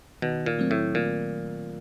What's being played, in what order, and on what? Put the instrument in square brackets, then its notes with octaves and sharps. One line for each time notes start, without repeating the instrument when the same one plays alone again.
[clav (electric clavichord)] B2 [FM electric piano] D#3
[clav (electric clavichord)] A#2
[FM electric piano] F#3 A3 C4
[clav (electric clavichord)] A2
[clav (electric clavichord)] A#2 [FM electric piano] D#3